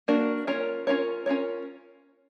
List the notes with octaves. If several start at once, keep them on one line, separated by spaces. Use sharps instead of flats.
A#3 D4 F#4 A#4
C#4 F4 A#4 C#5
C#4 F4 A#4 C#5
C#4 F4 A#4 C#5